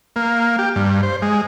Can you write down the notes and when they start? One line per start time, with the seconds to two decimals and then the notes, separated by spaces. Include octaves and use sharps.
0.16 A#3
0.59 G4
0.76 G2
1.03 C5
1.22 G#3